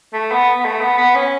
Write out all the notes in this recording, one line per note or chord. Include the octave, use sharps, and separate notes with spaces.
A3
B3
B3
A3
B3
B3
C#4